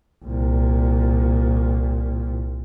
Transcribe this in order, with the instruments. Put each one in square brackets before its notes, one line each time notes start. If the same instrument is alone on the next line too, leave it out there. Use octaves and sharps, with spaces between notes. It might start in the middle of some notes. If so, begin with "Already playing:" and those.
[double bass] C2 A#2